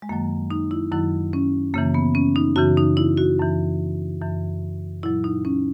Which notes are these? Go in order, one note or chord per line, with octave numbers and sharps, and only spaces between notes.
G#3
F#2 D#3 F#3 A#3
D#4
E4
F#2 D#3 F#3 E4
C#4
F#2 C#3 E3 A#3
B3
C#4
D#4
F#2 C#3 E3 F#4
D#4
E4
F#4
F#2 E3
F#2 E3
A#2 F#3 E4
D#4
C#4